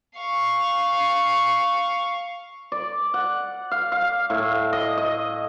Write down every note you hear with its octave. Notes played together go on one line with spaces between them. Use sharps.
F5 C#6
D5
F#5
F5
F5
A2
D#5
D#5